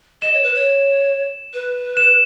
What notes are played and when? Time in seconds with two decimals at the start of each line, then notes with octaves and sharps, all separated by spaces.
0.22 D#5 E7
0.34 C#5
0.43 B4
0.55 C#5
1.54 B4
1.97 E7